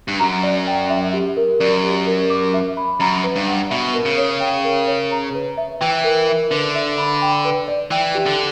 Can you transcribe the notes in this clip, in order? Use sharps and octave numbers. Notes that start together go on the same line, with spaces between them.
G2
F#2 A#5
D5
G5
E5
G4
A#4
F#2 D5
G4
A#4
D6
E5
B5
F#2 A#5
B4
G2
F#5
B2 E5
A#4
C#3
C#5
G5
A#4
C#5
A#5
B4
E5
E3 G5
A#4
E5
D3 B4
E5
B5
G5
B4
D5
E3 G5
G4
D3